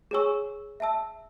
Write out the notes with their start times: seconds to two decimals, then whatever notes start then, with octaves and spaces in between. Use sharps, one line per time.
0.11 G#4 C#5 G#5 C#6 E6
0.80 E5 A5 E6